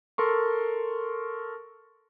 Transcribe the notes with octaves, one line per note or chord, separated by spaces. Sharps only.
A4 A#4 C6 C#6